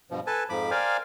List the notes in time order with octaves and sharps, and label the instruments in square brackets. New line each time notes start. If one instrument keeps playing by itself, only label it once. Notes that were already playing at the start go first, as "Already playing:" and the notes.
[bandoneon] G2 B2 F3
A4 B4 G#5 A5
F2 G#2 F3 B5 D6
A#4 C5 D5 F5 G5 G#5